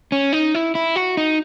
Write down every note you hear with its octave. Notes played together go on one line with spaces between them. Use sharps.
C#4
D#4
E4
E4
F#4
D#4